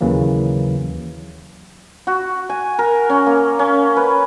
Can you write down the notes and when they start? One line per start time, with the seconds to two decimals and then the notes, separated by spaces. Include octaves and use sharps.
0.01 D#2 C#3 E3 F#3 A#3
2.07 F#4
2.50 G#5
2.79 A#4
3.09 C#4
3.26 A#3
3.59 C#4
3.97 B4